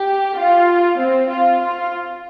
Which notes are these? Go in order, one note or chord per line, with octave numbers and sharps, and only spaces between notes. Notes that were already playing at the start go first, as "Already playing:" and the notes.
Already playing: G4
F4
C4
F4
F4